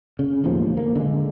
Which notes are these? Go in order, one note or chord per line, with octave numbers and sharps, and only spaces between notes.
C#3
E1 D#2 A2 F3
A#3
D3 G#3